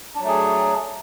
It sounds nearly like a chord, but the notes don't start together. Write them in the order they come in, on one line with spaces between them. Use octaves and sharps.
D4 F#3 A3 G#4